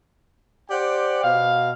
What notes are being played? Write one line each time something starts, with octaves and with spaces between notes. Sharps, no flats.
G4 C5 D5 F#5 G5
B2 F5